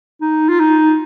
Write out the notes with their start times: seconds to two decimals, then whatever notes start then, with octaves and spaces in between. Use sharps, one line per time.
0.21 D#4
0.49 F4
0.60 D#4